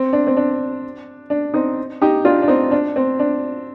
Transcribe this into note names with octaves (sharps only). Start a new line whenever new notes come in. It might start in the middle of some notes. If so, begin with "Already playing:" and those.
Already playing: C4
D4
C4
D4
D4
C4 D#4
D#4 G4
D4 F4
D4
C4 D#4
D4
C4
D4